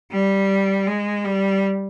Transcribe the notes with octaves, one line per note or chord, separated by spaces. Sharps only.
G3
G#3
G3